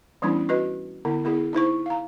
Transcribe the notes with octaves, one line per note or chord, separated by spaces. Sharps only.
E3 G3 B3 C#4 D4 E4
F#4 B4 D#5
D3 B3 E4
B3 E4 G#4
D#4 E4 C5 C#6
F5 A#5